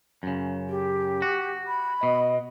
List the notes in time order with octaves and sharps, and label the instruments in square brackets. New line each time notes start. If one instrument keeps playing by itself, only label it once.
[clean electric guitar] F#2 C#3
[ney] G4
[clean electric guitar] F#4
[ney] B5
[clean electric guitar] B2 [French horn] D#5